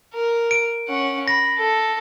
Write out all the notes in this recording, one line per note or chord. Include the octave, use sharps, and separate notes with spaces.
A#4
D7
C#4 F#5
B5 A#6
A4